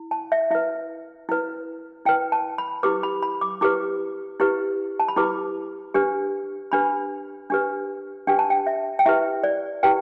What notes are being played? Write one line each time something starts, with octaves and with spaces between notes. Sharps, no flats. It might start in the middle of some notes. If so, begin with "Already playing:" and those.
Already playing: E4
A5
E5
E4 B4 E5
E4 B4
E4 B4 G5
A5
B5
E4 G4 B4 D6
B5
B5
D6
E4 G4 B4 D6
E4 G4 B4
A5
B5
E4 G4 B4 D6
D4 G4 B4
D4 G4 B4 B5
D4 G4 B4
D4 G4 B4 G5
A5
G5
E5
G5
E4 G4 B4 E5
D5
E4 G4 B4 G5